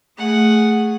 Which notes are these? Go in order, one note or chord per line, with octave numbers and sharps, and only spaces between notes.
A3 G#4 F#5